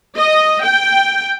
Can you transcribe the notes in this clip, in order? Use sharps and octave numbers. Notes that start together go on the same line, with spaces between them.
D#5
G5